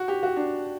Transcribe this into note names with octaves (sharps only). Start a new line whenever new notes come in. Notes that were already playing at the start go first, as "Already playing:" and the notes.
Already playing: F#4
G4
F#4
D4